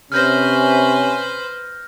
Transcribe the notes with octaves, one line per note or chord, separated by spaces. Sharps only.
C3 C#4 B4 C5 F6 G6 A#6